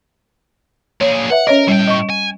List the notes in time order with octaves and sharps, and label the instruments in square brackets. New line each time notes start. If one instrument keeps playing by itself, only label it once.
[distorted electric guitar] A#2 G#4 [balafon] C#5
[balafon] B4 E5 [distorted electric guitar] F#5
[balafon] C#4 C#5 D#5 [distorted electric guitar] A#4
[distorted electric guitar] A2 G5 [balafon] G3
[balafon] D#5 C#6
[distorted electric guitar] G#5